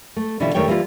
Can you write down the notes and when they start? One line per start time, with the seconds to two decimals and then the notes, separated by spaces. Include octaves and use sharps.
0.16 A3
0.40 B2 D3 E3 G3 E4 F4
0.54 E2 D#3 G3 A3 C#5 G5
0.68 E3 G3 A#3 D#4 F4